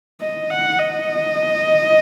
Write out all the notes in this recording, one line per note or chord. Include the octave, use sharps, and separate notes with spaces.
D#5
F#5
D#5